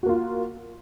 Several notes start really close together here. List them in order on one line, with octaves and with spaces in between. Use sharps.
F#4 A#3 F4